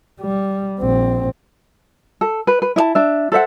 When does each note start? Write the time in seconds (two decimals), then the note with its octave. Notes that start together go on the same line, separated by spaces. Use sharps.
0.21 G3
0.80 A#1 C4
2.21 A4
2.47 B4
2.62 B4
2.76 E4 D#5 A5
2.95 D4 E5
3.32 A4 C5 E5 F#5